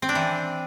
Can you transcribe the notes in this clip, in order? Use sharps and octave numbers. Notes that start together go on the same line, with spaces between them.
C4
D4
E3